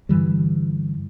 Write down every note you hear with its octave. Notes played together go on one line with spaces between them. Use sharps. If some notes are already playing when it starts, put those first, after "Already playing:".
G2 D3 E3 G3